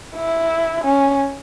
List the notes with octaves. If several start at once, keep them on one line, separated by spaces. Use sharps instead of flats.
E4
C#4